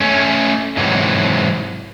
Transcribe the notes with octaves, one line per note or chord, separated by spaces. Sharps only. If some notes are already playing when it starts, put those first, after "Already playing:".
A3 C#4
G#2 C3 E3 F#3